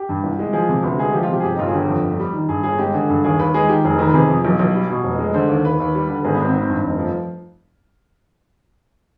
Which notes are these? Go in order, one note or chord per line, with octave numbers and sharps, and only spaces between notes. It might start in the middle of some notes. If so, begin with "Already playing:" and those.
Already playing: G4
G2
C2
G#3
F3 G#4
C3
D2 B4
G#3 G#4
F3 G4
F4
C3 G4
G#4
G1 G4
D#4
G1 F4
G#4
D3 G4
F2
G1
G3
D#3
G2 G#4
G1 G#4
G#3 G4
D3 G#4
G2
D#2 G#4
D#2 B4
G#3 G#4
D#3 G4
F1 G#4
D#3 B4
B4
C3 G#4
F2
B1
B1
G3
B2
F1
G#3
D3 C5
D#2
D#2 B4
D#2
G3
D3
B4
G#1 G#4
B3
G#1 C4
D#3 B3
C4
G2
F1
F3